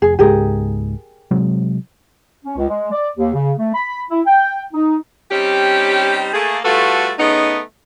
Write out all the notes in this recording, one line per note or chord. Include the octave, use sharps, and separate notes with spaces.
F1 G#4
C#2 G#2 G#3 G4 G#4 A#4
C3 F#3 G#3
C#4
C#2
G#3
D5
D#2
C#3
A3
B5
E4
G5
D#4
G3 C4 C#4 D#4 G4
A3 A#3 G#4
G3 A3 F4 F#4 A4 B4
C#3 A3 B3 D#4